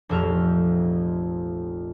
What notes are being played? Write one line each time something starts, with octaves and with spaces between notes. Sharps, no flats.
F1 A#1 F2 F3 E5 F6